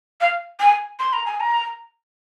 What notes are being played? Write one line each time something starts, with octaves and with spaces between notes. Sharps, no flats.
F5
G#5
C6
A#5
G#5
A#5